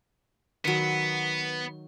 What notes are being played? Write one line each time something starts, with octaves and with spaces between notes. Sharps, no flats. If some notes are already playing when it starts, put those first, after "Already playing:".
D#3 F#3 B3